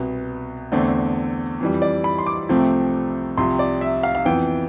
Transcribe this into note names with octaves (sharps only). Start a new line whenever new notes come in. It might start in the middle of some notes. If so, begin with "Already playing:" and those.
Already playing: C2 B2 B3
E2 D3 A3 C4
F2 E3 G3
D5
B5
C6
D6
C2 C3 F3 A3 C4
C2 C3 F3 C6
D5
E5
F5
F5
F2 E3 B3 G5